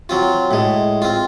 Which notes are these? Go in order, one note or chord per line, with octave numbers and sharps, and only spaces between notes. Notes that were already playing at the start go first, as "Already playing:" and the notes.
F#3 C4 F4
A2 G#3
C4 F4